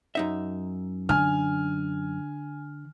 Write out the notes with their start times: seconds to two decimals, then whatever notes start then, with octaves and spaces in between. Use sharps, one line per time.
0.15 F#2 D#4 E5
1.09 D3 G#5 F6